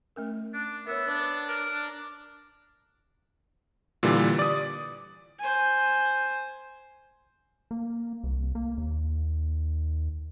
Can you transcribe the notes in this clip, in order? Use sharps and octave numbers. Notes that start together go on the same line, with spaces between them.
A3 C#4 A#4
D4
B3 A#4 C#5 E5
D4 B4 C#5
A#4
D4
A#2 D3 E3 G3
D5 D#6
C5 G#5
A#3
C2
A#3
D#2